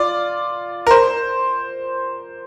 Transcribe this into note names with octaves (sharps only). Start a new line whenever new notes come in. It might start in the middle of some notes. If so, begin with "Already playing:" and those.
Already playing: F4 D5
A#4
C5